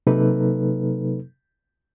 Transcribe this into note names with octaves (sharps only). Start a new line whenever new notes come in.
C3 F#3 A#3 D#4 A4 B4